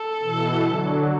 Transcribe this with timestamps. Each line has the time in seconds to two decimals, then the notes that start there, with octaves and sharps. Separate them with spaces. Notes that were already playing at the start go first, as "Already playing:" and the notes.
Already playing: A4
0.22 B2 E3
0.65 D3 F#3